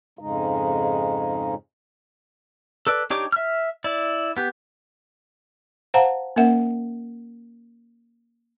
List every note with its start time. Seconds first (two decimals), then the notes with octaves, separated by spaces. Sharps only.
0.19 F2 G#2 C#3 G#3 D#4
2.87 A4 B4 D5
3.10 D4 D#4 G4 C#5 D6
3.32 E5 F6
3.84 E4 D5
4.37 B3 G4
5.94 C5 F5 F#5 A5 A#5
6.36 A#3 C#4 A#4 E5 F#5